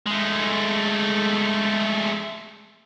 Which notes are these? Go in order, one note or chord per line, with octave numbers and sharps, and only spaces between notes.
G#3 A3